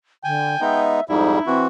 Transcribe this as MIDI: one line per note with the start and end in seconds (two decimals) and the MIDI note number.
0.24 0.59 50
0.24 0.83 79
0.24 0.61 80
0.61 1.00 56
0.61 1.00 59
0.61 1.00 63
0.61 1.04 76
1.09 1.39 41
1.09 1.39 44
1.09 1.39 55
1.09 1.44 63
1.09 1.64 64
1.47 1.67 52
1.47 1.67 60
1.47 1.67 66